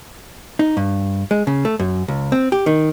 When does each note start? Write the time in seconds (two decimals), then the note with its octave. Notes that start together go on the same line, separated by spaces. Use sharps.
0.59 D#4
0.77 G2
1.31 G#3
1.47 C#3
1.65 A3
1.79 F#2
2.08 C#2
2.32 C4
2.52 G4
2.66 D#3